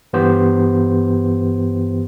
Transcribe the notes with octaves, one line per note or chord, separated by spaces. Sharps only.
G2 E3 B3 G4 C5